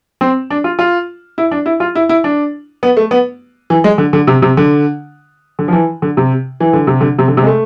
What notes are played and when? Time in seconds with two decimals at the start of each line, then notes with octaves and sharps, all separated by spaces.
0.21 C4
0.50 D4
0.64 F4
0.79 F4
1.38 E4
1.51 D4
1.66 E4
1.80 F4
1.95 E4
2.09 E4
2.24 D4
2.83 B3
2.97 A3
3.11 B3
3.70 E3
3.84 G#3
3.98 D3
4.13 D3
4.27 C3
4.42 C3
4.57 D3
5.59 D3
5.68 F3
5.73 E3
6.02 D3
6.17 C3
6.60 E3
6.73 D3
6.87 C3
7.01 D3
7.18 C3
7.28 D3
7.37 C3
7.43 G#3
7.47 A3